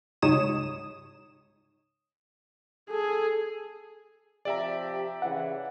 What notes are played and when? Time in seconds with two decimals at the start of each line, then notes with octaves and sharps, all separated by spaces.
0.22 C#2 G#2 D#4 C#5 D#6 E7
2.90 G#4 A4
4.45 C3 F3 G4 D5 E5 A#5
5.22 C#3 E3 F#5